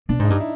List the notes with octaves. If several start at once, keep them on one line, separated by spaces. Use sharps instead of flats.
B2 D4
G#2
D#4
G2
E4